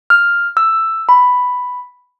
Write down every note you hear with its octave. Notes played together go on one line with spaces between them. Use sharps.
F6
E6
B5